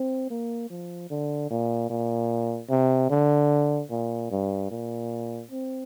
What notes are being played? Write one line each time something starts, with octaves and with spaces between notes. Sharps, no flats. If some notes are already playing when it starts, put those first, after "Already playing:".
Already playing: C4
A#3
F3
D3
A#2
A#2
C3
D3
A#2
G2
A#2
C4